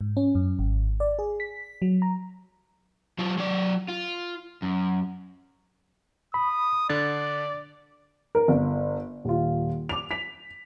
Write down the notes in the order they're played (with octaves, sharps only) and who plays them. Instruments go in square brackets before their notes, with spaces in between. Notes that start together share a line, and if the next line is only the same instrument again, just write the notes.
[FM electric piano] G#2
C#4
F#2
G#1
D5
G#4
B6
F#3
A#5
[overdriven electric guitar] F#3 F4
F#3 D5
F4
F#2
[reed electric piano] B5 [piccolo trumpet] D#6
[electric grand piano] D3 D4 [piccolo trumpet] D5 [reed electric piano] A6
[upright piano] A#4
G1
D#1 F4
D6 F7
B6 F7